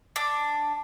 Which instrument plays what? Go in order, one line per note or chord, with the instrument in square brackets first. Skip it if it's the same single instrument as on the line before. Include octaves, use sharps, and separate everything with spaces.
[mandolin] D4